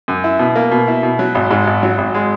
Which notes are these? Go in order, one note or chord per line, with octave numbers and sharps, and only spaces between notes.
F#2
E4
B2
A#3
B2
E4
B2
F#3
G#1
G#2
G#1
F#3
G#1
G#3